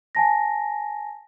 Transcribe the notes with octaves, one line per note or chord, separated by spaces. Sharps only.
G#5 A5 A#6